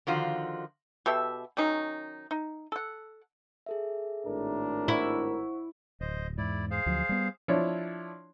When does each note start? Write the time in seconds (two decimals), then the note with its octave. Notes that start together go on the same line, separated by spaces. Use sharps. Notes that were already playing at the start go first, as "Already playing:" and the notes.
0.07 D3 D#3 F3 F4 F#4
1.06 B2 G4 A4 E5
1.57 D#3 F#3 C#4 D#4
2.31 D#4
2.72 A4 F#5
3.66 G#4 A4 E5
4.26 G#1 A2 D4 A#4
4.88 E4 C5 F#5 C#6
6.01 D1 C5 D#5
6.38 E2 G#2 E4 D5
6.71 G#4 C5 F5
6.86 D2 F3 F#3
7.09 G3 B3
7.48 F3 D4 E4 C#5